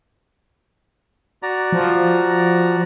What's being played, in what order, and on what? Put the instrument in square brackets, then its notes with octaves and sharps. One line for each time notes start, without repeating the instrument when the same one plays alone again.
[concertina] F#4 D5 A#5
[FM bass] F3